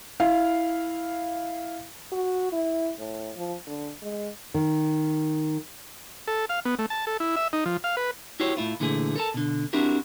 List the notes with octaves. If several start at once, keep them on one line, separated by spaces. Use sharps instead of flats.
E4 F5
F#4
E4
A2
F3
D3
G#3
D#3
A4
F5
B3
A3
A5
A4
E4
E5
D#4
F3
F5
B4
E4 F#4 G4 C5 C#5
A2 E4 F4
A#2 D3 E3 A3 G#4
A4 A#4 A5
B2 D3
C4 D4 E4 F#4 G4 A#4